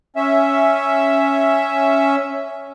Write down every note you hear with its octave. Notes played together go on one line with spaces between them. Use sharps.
C#4 E5